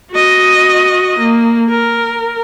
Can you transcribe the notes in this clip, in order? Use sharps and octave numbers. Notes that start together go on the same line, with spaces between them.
F#4 D#5
A#3
A#4